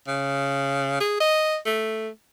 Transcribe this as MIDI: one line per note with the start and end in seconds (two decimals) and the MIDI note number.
0.08 1.00 49
1.01 1.18 68
1.21 1.57 75
1.66 2.09 57